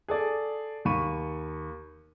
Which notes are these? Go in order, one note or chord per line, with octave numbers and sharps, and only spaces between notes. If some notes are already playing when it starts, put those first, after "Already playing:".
G#4 A4 D5
D#2 B5 C#6 D#7